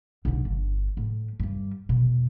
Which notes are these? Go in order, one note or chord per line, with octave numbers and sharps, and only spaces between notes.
B1 D3
G1
A2
G2 G3
E1 B2